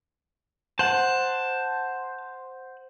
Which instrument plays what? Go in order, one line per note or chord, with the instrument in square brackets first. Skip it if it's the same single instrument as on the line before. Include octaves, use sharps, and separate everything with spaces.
[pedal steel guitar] C5 F#5 [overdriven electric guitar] A5